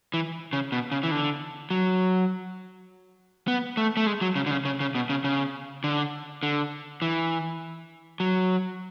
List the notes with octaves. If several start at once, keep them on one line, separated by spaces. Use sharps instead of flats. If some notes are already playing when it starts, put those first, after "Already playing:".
E3
C#3
B2
C#3
E3
D3
F#3
B3
A3
A3
G#3
F#3
C#3
D3
C#3
C#3
C#3
B2
C#3
C#3
D3
D3
E3
F#3